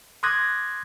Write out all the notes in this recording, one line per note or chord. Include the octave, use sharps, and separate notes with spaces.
C6 D6 D#6 F#6 G#6 A#6